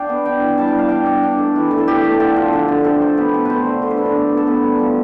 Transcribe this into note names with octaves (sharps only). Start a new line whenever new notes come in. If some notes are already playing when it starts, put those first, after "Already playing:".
Already playing: D4 F5 G5
B3
D4 G5
E3
G3 A5
G5
G3 F5
D4 G5
D4
D4
A3
E3
A3
A4
A3 G4
A3
D3 A4
F3
D3
D3
C3 A4
C3
B3 B4
C3
A3 B4 C5
D3
D3 C5
B4
D4 A4
B4
B3
B3
A4
B3 B4
G3
F3